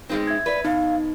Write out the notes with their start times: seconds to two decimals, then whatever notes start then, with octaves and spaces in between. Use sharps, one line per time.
0.09 B2 G#3 C4 D#4
0.27 E5 G#6
0.46 B4 D5
0.65 B2 D#4 F5